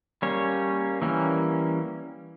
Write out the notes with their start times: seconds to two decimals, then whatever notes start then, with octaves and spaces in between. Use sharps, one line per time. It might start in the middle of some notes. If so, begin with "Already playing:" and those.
0.22 G3 A#3 C#4 C#5
1.02 E3 G3 A#3 C#4